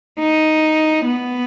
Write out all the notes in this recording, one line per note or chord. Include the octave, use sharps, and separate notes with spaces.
D#4
B3